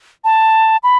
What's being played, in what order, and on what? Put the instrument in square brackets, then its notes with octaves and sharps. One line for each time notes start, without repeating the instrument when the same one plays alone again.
[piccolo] A5
B5